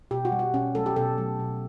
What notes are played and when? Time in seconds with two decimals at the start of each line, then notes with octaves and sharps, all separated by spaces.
0.11 B2 G4
0.25 F#4
0.32 G3
0.39 F#4
0.53 B2 C#4
0.75 F#3 A3 A4
0.86 G4
0.96 B2 A4
1.18 F#3 A3
1.39 B2